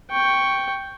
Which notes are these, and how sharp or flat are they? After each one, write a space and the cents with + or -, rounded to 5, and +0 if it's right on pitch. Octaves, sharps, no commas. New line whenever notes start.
G5 +0 C#6 +0